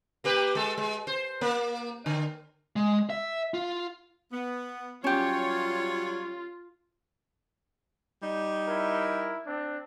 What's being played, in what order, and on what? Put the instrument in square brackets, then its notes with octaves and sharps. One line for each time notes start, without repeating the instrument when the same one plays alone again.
[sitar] A#3 G4 B4
G#3 A4
G#3
C5
A#3
D3
[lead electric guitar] G#3
E5
F4
[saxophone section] B3
[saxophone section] F#3 G3 C#5 [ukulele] C#4 G4 [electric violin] F4
[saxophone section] G3 D#4
[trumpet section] E4 A#4
C4 D4